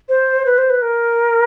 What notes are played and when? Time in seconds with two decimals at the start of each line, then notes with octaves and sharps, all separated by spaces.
0.09 C5
0.46 B4
0.58 C5
0.70 B4
0.82 A#4